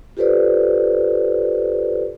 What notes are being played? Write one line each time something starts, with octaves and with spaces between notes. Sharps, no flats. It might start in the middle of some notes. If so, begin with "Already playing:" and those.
F4 G4 A4 B4 C5 D5